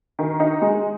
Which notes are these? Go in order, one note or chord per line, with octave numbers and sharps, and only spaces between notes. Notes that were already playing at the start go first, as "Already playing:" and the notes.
D#3
D#4
G#3